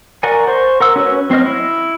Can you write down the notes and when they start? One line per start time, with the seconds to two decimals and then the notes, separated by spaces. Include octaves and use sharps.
0.23 F#4 A#4 D5 F#5 G#5
0.48 C5 C6 C#6
0.80 A#4 F#5 E6
0.96 C#4 F#4 B4 C#5
1.30 F#3 C4 C#5 D#5 F6
1.46 E4